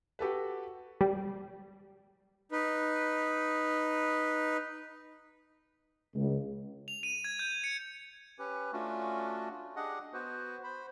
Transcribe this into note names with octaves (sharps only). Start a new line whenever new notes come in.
F#4 G4 A4 B4
G3
D#4 B4
C#2
F7
D#7
G#6
G6
C#7
C#4 G4 B4
A3 C#4 D4 F4 F#4
D4 G4 G#4 D#5 F#5
B3 F#4 B4 C5
C5 B5